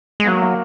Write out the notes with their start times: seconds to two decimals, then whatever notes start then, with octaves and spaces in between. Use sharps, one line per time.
0.20 G#3
0.24 B3
0.27 F#3 A#3
0.42 A#3